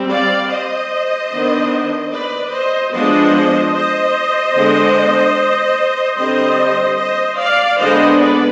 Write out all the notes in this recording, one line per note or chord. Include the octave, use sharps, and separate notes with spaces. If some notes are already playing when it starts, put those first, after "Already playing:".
Already playing: G3 C4
D5 F5
C5 D#5
D#3 B3 D4
B4 D5
C5 D#5
F3 G#3 B3 D4 C5 D#5
C5 D#5
D3 G#3 B3 D4
D3 G3 C4 C5 D#5
C5 D#5
D5 F5
D3 G#3 B3 D4 C5 D#5
B4 D5